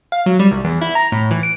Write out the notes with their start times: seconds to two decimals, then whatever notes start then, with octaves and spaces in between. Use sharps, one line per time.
0.12 F5
0.26 F#3
0.39 G3
0.51 C2
0.64 E2
0.82 E4
0.95 A#5
1.12 A2
1.31 E3
1.43 D7